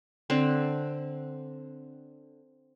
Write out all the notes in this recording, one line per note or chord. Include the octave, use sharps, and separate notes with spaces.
D3 C4